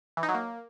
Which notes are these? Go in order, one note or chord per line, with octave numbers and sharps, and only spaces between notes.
E3
D#4
F#3
A#3